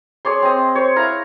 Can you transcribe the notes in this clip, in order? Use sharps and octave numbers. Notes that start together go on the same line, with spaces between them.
G#4 C#5 D5 C6
C4 D#5
C5 C#5
E4 F5 A#5